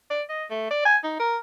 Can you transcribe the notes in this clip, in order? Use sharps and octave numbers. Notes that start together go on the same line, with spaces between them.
D5
D#5
A3
D5
G#5
D#4
A#4